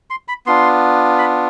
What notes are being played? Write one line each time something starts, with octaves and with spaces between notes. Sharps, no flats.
C6
B5
B3 D4 F4 C6
B5